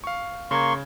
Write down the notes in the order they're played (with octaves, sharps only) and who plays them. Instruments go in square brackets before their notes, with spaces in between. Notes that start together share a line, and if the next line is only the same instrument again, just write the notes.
[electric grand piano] F5 C#6
[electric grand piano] C#3 G#6 [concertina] A#3 C6 C#6